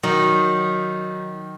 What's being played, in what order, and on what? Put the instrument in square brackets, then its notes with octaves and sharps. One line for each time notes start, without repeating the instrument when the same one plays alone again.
[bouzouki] D#3 [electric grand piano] F#3 D#4